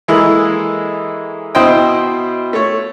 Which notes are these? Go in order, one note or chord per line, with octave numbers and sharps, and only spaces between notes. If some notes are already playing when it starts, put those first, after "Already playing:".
E3 G#3 A#3 E4 A4
B2 E4 C5 D#5 G5
A3 C#5